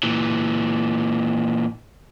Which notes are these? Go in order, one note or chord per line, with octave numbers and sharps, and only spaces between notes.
A#2 E3